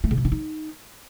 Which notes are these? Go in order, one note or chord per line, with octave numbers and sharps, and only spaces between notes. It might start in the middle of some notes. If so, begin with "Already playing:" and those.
A3
C#3
C3
D4
D#4